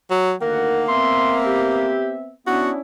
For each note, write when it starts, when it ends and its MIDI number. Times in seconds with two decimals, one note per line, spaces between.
0.11 0.33 54
0.42 0.86 38
0.42 0.86 51
0.42 1.94 58
0.42 0.83 70
0.42 0.86 78
0.88 2.34 59
0.88 2.34 60
0.88 2.34 76
0.88 1.36 84
1.46 2.12 67
2.47 2.71 59
2.47 2.80 61
2.47 2.80 62
2.47 2.80 64
2.47 2.71 66